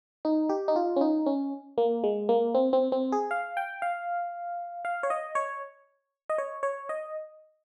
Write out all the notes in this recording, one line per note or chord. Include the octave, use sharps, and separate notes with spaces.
D#4
G4
D#4
F4
C#4
D#4
C#4
A#3
G#3
A#3
C4
C4
C4
G#4
F5
G5
F5
F5
C#5
D#5
C#5
D#5
C#5
C#5
D#5